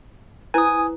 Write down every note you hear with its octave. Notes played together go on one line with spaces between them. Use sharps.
E4 B4 C5 G#5 D#6